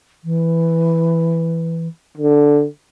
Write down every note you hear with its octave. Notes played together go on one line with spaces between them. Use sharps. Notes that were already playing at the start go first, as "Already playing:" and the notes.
E3
D3